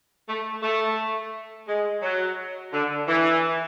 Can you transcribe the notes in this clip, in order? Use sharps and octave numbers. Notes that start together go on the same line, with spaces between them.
A3
A3
G#3
F#3
D3
E3